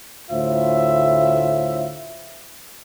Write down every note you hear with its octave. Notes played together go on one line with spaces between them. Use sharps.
D2 A2 F4 C5 E5